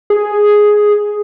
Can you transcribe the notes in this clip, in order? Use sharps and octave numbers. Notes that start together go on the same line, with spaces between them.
G#4